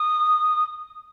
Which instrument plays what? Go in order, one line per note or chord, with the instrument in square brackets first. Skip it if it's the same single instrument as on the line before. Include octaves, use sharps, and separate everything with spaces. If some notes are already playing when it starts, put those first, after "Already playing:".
Already playing: [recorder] D#6